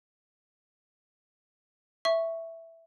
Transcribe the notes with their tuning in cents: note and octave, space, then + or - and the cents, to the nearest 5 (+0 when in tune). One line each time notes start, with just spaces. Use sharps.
E5 +0 C#6 +0